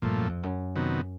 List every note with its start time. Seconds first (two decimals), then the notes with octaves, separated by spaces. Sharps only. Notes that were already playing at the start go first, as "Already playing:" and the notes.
0.02 G2 A#2 F3 A3
0.17 F#2
0.29 F2
0.43 F#2
0.75 C3 D#3 F#3 B3